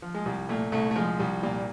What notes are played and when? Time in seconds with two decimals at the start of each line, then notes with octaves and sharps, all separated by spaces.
0.02 F3
0.14 G#3
0.25 C2 G3
0.49 A#2 A3
0.72 C2 A3
0.91 A3
0.96 F3 G#3
1.19 C2 G3
1.43 A#2 G3